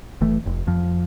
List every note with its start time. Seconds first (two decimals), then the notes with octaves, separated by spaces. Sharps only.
0.21 F#1 E3 A3
0.46 F1
0.67 F2 F3